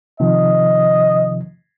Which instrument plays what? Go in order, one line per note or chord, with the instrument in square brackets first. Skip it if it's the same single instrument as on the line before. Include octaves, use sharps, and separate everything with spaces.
[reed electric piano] C3 D#3 F3 [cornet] D#5